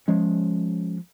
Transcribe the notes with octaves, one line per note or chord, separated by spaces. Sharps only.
F3 G#3 C#4